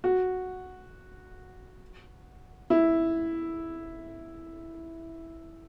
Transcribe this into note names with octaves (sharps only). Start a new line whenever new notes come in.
F#4
E4